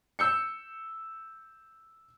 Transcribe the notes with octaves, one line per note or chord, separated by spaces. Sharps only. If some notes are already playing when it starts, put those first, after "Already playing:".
E6 G6 C#7